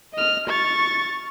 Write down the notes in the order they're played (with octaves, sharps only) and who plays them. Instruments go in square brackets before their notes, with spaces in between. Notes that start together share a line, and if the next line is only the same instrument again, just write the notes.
[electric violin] D#5 F6
C#6 A6